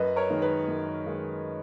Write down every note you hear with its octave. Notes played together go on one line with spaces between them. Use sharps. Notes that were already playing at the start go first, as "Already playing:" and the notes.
Already playing: F#2 B4 D#5
A#4 C#5
D#3 G#3 D#4
B4
F#2
D#3 G#3 D#4